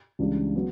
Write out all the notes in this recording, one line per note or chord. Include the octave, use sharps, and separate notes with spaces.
C#2 C#3 E3 G3 D4
F#3 B3